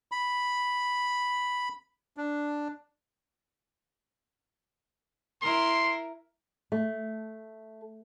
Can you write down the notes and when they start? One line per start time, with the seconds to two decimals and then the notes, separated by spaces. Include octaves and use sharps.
0.12 B5
2.17 D4
5.42 E4 A#4 C6
6.72 A3